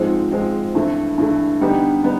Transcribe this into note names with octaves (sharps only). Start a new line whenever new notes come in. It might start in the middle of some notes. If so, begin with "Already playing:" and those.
Already playing: G#2 F3 G#3 C4
G#2 F3 G#3 C4
G2 E3 A3
G2 E3 A3
D3 G3 B3 D#4 G4
D3 G3 B3 D#4